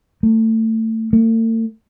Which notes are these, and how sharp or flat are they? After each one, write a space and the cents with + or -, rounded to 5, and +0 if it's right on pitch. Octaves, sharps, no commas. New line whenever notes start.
A3 +25
A3 +45